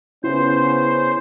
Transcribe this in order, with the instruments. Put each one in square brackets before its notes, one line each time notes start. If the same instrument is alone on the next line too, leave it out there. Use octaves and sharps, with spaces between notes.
[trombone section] C#3 B3 C#4 [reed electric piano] E4 [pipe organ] C5